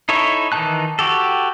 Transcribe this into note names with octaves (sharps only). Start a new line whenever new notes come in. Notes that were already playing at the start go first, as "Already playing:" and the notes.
D#4 E4 A4 C#5
D#3 E3 D#4 A5 F#6
F#4 G4 A4